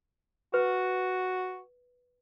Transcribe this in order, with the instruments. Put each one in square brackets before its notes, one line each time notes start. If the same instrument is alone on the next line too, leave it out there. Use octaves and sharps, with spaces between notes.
[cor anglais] F#4 [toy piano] B4